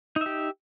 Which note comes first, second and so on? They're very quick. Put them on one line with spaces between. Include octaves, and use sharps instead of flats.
D#4 E5 G4